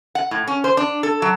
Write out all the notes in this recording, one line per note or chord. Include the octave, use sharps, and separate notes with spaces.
F#5
A2
C#4
C5
D4
A4
F#3